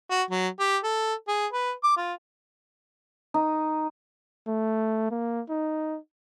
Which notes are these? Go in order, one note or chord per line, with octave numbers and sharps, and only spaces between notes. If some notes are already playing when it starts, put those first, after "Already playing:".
F#4
F#3
G4
A4
G#4
B4
D6
F4
D#4
A3
A#3
D#4